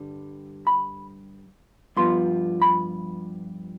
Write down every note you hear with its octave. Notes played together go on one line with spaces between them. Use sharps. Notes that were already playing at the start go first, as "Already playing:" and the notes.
Already playing: G2 D3 G3
B5
G2 F3 B3 F4 C6
B5